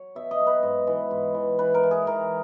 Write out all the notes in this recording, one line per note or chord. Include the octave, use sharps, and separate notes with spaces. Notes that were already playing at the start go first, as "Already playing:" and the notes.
Already playing: F#3 C#5
B2 E5
D#5
F#3
B4
G#2
E3
G#2
E3
E3 B4
A#4
E3
G#4
E3 A#4